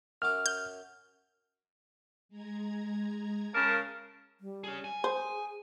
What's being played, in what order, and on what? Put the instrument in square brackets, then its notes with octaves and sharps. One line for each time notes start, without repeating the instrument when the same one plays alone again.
[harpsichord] F#2 F#3 D6 [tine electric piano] F6
[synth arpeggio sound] G6
[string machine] G#3 A#5 G#6
[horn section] C#3 A#4 A5
[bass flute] G3
[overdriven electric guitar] C#4 G#4
G#5
[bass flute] G#4 [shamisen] C5